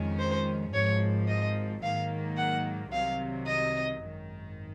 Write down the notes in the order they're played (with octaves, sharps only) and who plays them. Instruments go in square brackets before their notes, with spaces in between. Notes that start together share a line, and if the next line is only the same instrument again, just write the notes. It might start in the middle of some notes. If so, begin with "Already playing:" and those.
Already playing: [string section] F2 D#3 G#3 C#4
[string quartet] C5
[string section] G#1 G#2 F3 [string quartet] C#5
[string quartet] D#5
[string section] G#2 D#3 F#3 A#3 [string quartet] F5
[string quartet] F#5
[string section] C2 C3 D#3 F#3 [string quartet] F5
[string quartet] D#5
[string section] G#1 F#2 D#3